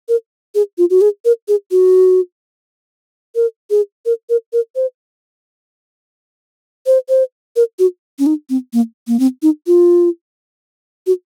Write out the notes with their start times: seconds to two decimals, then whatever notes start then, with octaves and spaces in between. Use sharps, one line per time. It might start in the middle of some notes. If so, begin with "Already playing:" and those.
0.09 A#4
0.55 G#4
0.78 F4
0.90 F#4
1.01 G#4
1.25 A#4
1.48 G#4
1.71 F#4
3.35 A#4
3.70 G#4
4.06 A#4
4.29 A#4
4.53 A#4
4.76 C5
6.86 C5
7.09 C5
7.56 A#4
7.79 F#4
8.19 C#4
8.26 D#4
8.50 C4
8.73 A#3
9.08 A#3
9.19 C4
9.42 D#4
9.67 F4
11.07 F#4